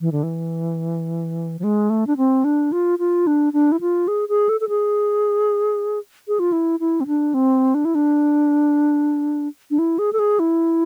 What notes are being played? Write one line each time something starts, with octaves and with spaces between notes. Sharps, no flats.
E3
D3
E3
F3
G#3
A3
D4
C4
D4
F4
F4
D4
D4
E4
F4
G#4
G#4
A4
A4
G#4
G#4
F4
E4
E4
C4
D4
C4
D4
E4
D4
D4
E4
G#4
A4
G#4
E4